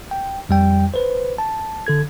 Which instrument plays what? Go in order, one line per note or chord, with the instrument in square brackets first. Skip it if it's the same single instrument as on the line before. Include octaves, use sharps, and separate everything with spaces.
[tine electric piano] G5
F2 G3 G5
B4 C5
A5
D3 A4 G#6